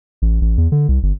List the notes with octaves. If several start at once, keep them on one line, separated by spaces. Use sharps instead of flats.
A1
A1
E2
D3
C2
G1